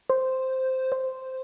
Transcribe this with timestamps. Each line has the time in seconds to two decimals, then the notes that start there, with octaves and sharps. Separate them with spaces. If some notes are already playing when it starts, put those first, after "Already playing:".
0.10 C5
0.92 C5